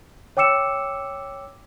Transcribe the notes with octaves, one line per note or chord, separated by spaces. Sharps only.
C#5 G5 D6 E6 C#7 E7